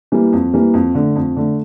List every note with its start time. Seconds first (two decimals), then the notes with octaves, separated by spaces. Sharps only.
0.12 E3 G3 A#3
0.33 F2
0.53 E3 G3 A#3
0.74 F2
0.95 D3 A3
1.16 F2
1.36 D3 A3